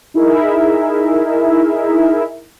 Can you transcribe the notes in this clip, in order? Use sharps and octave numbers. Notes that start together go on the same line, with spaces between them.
D#4 E4 G#4 A#4 E5